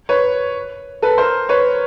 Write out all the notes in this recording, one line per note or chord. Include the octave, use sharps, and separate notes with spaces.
B4 C#5
A4 B4
A#4 C5
B4 C#5